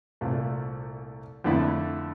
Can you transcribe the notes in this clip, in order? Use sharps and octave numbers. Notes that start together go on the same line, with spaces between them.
C2 A#2 A3
F2 D3 A3 E4